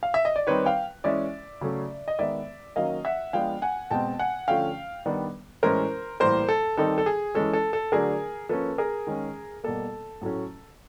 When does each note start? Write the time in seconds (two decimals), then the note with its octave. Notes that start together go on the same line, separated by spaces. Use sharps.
0.03 F5
0.14 E5
0.25 D#5
0.36 D5
0.47 D#3 G3 C4 D#4 B4 C#5
0.66 F5 G5
1.04 E3 G#3 C#4 D5 E5
1.61 C#3 F#3 A3 C#4
2.08 D#5
2.19 D#3 G#3 B3 D5 E5
2.76 D#3 F#3 A#3 C#4 D#5 F5
3.05 E5 F#5
3.33 F3 G#3 B3 D4 F5 G5
3.62 F#5 G#5
3.91 B2 G#3 C4 G5 A5
4.19 F#5 G#5
4.48 D3 F3 A3 C#4 F5 G5
5.06 D#3 G3 B3 D4
5.63 A2 E3 G#3 C#4 A#4 C5
6.20 A2 E3 G3 A#3 A#4 C5
6.49 A4
6.77 D#3 G3 C4 D#4 A4
6.98 A4
7.06 G#4
7.35 E3 G#3 C#4 A4
7.53 A4
7.73 A4
7.92 D3 F#3 A3 D4 G#4 A#4
8.49 F3 A#3 C#4 A4 B4
8.78 G#4 A#4
9.07 D#3 G#3 C#4
9.64 B2 G3 A#3 A4
10.21 A2 F#3 A3 C#4